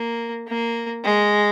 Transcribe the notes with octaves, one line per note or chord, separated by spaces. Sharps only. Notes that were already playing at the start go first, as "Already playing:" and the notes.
Already playing: A#3
A#3
G#3